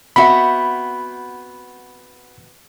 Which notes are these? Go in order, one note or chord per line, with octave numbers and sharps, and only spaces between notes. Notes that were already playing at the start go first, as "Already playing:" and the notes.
B3 C4 F#4 D#5 E5 B5